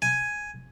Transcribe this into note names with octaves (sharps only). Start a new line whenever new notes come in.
G#5